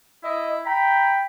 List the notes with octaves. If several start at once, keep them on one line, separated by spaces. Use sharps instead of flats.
E4 D#5
G5 A#5 B5